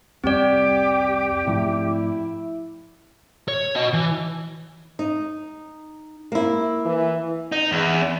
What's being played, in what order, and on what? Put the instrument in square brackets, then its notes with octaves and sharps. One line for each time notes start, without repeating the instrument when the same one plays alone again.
[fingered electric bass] C2 F2 G3 [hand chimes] C4 D5 [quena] G4
[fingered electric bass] G#2 F3 A3 [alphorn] E4
[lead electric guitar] C#5
F#4 D#5
E3
[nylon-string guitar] D#4
A#3 E4
[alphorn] E3
[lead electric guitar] D#4
E2